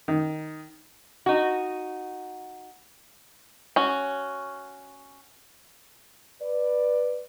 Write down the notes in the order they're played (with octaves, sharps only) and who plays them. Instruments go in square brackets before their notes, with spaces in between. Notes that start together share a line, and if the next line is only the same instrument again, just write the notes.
[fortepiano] D#3
[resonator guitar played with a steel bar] D#4 F#4
[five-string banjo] C#4 F#4
[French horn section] B4 D5